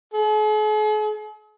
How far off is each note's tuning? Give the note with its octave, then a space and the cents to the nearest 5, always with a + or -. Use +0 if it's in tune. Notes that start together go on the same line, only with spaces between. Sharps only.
G#4 +45